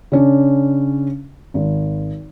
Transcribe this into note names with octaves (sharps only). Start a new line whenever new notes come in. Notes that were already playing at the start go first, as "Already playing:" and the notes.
C#3 C#4 D4
G#1